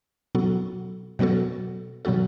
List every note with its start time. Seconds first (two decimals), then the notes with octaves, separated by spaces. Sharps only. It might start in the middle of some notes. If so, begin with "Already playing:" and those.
0.35 B2 F#3 B3 F#4 A4
1.19 B2 F#3 B3 F#4 A4
2.05 B2 F#3 B3 F#4 A4